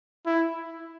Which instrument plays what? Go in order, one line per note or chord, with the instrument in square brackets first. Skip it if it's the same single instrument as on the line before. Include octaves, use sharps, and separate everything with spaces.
[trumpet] E4